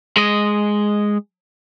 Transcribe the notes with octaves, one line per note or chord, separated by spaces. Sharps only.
G#3 D#5